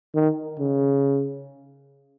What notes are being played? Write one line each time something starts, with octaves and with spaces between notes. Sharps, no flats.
D#3
C#3